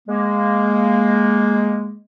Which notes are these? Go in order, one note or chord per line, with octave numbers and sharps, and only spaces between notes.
G#3 A#3